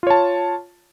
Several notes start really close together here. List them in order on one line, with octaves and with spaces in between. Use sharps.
F4 C#5 A5